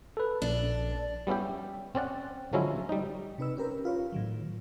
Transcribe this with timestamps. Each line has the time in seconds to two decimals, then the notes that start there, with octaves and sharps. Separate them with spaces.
0.17 A4 B4
0.42 A#1 D4
1.27 G3 B3 C#4 E4 G4
1.95 C4 C#4 D5 F#5
2.53 D3 F3 F#3 G#3 C#4 E4
2.89 G3 D#4
3.38 C3 D#4 B4 E6
3.57 C#4 G4 A#4 B4
3.85 F4 B4 C#5
4.12 A2 D#3 F#3